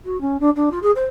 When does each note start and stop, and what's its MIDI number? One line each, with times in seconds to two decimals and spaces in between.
0.04 0.19 66
0.20 0.39 61
0.40 0.49 62
0.55 0.69 62
0.71 0.79 65
0.82 0.91 68
0.95 1.04 72